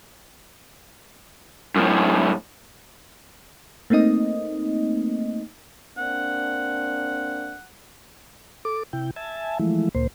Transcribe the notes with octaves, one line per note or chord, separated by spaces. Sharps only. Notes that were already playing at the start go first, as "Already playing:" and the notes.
F#2 A2
A3 A#3 C4 D#4 D#5
A#3 C4 D4 F#5
A4 D6
C3 E4 G5
E5 G#5 A5
E3 F3 G#3 A3 E4
D2 A#2 A#3 C5